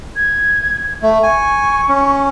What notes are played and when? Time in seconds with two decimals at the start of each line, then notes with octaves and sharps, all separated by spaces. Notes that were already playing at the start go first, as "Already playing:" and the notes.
0.16 G#6
1.03 A3
1.23 G#5 C#6
1.88 C#4